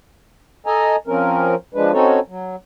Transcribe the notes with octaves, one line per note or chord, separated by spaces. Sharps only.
A4 D#5 G#5 A#5
F3 C4 C#4 A#4
F3 G#3 D4 B4
C4 C#4 D#4 F#4 A4 C#5
F#3